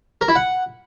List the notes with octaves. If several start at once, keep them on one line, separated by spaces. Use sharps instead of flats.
A#4
E4
F#5